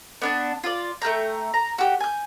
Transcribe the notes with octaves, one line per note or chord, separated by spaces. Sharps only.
B3 D4 A5
F4 D5
A3 A#3 G5 A#5
A#5
F#4 G4
G#5 G6